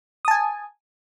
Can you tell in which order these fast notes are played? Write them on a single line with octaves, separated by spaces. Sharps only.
D#6 A5 G#5